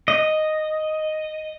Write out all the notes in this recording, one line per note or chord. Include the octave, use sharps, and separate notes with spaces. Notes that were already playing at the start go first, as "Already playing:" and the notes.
D#5